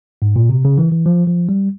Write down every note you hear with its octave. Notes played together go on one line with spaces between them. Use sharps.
G#2
A#2
C3
C#3
E3
E3
F3
F3
G3